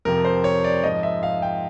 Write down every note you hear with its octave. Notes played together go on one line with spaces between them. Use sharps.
F2 C3 F3 A#4
C5
C#5
D5
G#2 F3 D#5
E5
F5
G5